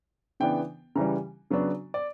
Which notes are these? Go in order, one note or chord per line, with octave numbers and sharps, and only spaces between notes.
C#3 E3 B3 D4 G5
C#3 E3 G3 A#5
C#3 F#3 B3 D4
D5